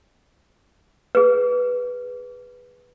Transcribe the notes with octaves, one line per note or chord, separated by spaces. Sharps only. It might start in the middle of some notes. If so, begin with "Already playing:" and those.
G#4 B4